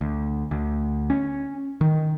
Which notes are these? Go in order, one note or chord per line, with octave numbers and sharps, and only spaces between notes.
D2
D2
C#4
D#3